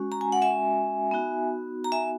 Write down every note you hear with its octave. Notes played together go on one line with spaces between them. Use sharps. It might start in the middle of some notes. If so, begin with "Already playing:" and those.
Already playing: G#3 C#4 F#4
A#5
G#5
F#5
E5 G#5
B3 D#4 F#4
A#5
E5 G#5